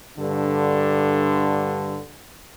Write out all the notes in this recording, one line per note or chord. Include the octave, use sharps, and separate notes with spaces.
G2 D3